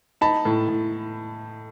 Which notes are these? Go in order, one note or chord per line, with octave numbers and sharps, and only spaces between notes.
D#4 A5 B5
A2
A2